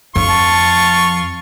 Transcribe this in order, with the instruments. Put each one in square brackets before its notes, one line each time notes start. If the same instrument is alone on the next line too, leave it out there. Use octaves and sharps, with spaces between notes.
[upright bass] F2 [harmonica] F4 C#6
[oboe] A5